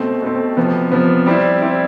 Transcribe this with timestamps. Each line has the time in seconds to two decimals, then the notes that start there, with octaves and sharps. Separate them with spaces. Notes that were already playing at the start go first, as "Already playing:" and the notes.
Already playing: B2 A3 C4
0.22 B2 A3 C4
0.57 C3 F3 B3
0.92 C3 F3 B3
1.27 G3 C4 E4
1.62 G3 C4 E4